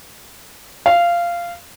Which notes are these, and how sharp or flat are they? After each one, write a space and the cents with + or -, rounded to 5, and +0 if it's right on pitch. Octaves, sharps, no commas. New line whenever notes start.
F5 -15